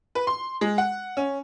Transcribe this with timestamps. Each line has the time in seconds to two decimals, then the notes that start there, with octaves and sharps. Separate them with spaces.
0.15 B4
0.27 C6
0.61 G#3
0.78 F#5
1.17 C#4